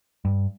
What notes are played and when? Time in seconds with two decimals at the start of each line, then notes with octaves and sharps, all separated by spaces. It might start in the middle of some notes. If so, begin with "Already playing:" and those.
0.25 G2